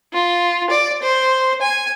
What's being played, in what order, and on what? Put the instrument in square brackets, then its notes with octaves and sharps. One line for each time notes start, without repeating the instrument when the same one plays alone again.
[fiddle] F4
D5
C5
G#5